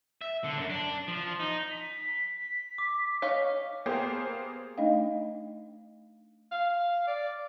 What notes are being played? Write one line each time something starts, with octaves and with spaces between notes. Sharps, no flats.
E5
D3
F#2
D4
F3
D#4
B6
B6
D6
C#5 D#5 F5
A#3 B3 G4 G#4 C5
A3 D4 D#4 D#5 F5 G5
F5
D5